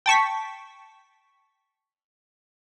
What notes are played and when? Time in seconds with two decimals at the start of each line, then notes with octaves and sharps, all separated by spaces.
0.06 G5 A5 C#6 B6